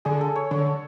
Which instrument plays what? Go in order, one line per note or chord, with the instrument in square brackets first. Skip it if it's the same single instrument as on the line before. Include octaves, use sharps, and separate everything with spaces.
[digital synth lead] D3 [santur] G#4
[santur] A4
C#5
[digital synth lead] D3 [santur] C#5